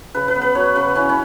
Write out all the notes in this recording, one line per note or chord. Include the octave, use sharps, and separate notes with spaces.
C#3 B4
B4
B3
B4
F#3 C#5
C#3 B4
E3 C#4
C#4